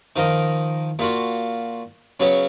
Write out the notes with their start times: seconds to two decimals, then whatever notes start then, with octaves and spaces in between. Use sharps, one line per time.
0.16 D#3 F3 A#4 D#5
0.99 A#2 F4 F#4
2.20 C#3 F#3 B3 C#4